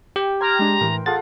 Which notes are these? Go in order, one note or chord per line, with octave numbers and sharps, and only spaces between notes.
G4 G5
G5 A#5 C6 F6 G#6
G#3 D4
A2 E3 A#4
F4 G#4 A4 F#5 A6